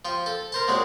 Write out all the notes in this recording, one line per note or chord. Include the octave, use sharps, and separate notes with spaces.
F3 G5
A4
A#4 C5 A5
A#2 F#3 G#3 C4